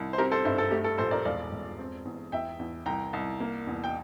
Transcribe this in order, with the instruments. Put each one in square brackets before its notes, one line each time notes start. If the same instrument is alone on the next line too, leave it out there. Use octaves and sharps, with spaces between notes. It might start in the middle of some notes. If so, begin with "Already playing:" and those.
Already playing: [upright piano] C2
C5
C4 G4 A#4
A4 C5
G2 C5 E5
A4
A3 G4
A4
A#1 A4 C5
A#4 D5
E1 D5 F5
E1
C4
E2
E2 E5 G5
E2
C2 G5 A#5
C2
A#3
E2
G5